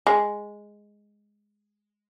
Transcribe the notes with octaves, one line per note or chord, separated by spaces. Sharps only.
G#3